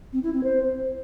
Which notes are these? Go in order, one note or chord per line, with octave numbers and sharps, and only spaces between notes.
C4
E4
C4
C5